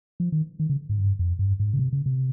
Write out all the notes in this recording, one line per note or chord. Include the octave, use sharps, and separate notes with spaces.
F3
D#3
D#3
C#3
G#2
G2
F2
G2
G#2
C#3
C3
C#3
C3